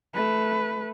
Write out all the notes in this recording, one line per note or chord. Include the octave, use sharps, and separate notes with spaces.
A3 B4